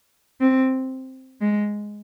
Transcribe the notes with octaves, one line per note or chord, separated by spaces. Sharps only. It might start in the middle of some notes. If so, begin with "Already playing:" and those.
C4
G#3